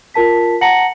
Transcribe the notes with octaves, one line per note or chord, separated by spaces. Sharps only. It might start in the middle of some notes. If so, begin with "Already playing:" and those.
F4 A#4 A5 B6
F#5 A5 A#5 A#6 C#7 F#7